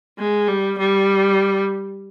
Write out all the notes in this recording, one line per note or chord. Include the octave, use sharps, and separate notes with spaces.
G#3
G3
G3